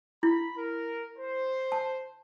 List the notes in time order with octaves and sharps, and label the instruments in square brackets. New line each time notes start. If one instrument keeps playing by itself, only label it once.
[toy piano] E4 [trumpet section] B5
[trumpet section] A#4
C5
[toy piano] A5